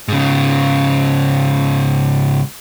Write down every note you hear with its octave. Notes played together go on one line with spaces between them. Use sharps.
G#2 C#3